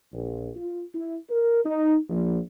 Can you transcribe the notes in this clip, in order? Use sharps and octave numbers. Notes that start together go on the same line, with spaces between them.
A#1
F4
E4
A#4
D#4
A#1